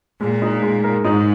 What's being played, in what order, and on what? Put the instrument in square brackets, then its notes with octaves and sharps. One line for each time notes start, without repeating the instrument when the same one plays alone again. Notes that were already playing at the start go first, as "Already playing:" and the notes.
[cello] A#2 [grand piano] G#3
[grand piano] D#4
G#3
A#4
[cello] G#2 [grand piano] D#4